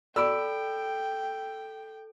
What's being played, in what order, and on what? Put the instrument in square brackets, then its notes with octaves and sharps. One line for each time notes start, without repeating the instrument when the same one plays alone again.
[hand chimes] A4 D7 [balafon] D5 D6 [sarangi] G5 [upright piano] B5 E6